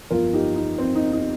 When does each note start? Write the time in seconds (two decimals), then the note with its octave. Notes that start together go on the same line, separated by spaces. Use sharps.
0.11 G1 F2 F3 F4 A#4
0.33 D#4 G4
0.56 D#4
0.78 C4
0.95 D#4
1.13 D#4